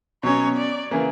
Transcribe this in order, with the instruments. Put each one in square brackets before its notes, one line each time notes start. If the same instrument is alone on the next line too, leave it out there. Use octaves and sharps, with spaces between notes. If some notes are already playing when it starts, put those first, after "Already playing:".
[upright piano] B2 F#3 C#4 [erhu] C#5
[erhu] D5
[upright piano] C#3 E3 A#3